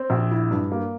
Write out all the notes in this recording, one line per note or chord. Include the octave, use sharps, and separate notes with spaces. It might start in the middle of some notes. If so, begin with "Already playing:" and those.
Already playing: C4
A#1
E4
G2
A#3